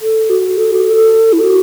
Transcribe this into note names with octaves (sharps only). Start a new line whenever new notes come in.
A4
F#4
A4
F#4
A4
E4
F#4